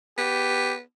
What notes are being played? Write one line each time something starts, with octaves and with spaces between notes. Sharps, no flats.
B3 G4